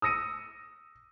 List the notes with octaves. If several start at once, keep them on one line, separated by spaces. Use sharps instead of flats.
D#6 E6 A#6 C#7 D#7